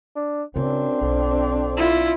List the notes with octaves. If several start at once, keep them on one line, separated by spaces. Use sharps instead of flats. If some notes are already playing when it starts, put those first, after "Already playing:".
D4
F#2 C#3 C4 D4 E4
B1 F2
E4 F4